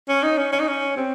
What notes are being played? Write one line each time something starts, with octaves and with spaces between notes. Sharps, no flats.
C#4
D#4
C#4
C#4
D#4
C#4
C4